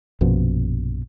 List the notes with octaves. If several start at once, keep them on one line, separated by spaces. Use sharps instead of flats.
A#1 F#2 B2 F3